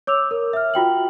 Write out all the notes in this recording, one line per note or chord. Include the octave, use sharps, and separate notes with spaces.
C#5 D6 E6 F7
A#4
E5 F6
F4 F#4 G5 F#7